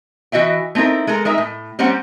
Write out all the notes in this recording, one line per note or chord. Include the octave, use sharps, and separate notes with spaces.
E3 F#4 D#5 E5 G5
A3 C4 D#4 E4 A#4
G#3 A4 A#4
G#3 D#4 A#4 E5
A2
G3 A#3 C4 C#4 C5 F#5